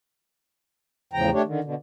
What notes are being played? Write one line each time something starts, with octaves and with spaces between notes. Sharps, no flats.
E2 A2 C#3 F3 G5 A#5
A3 D4 G4 C#5
D3 D#3
B2 D3